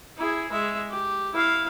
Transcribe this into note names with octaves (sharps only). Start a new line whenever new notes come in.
E4 G#4
G#3 E5
G4
E4 F5